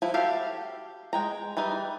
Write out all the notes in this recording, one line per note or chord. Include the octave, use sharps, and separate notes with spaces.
F3 E4 F#4
F#4 G4 A4 E5 F5
G#3 G5 A#5
E3 G3 D#4 D#5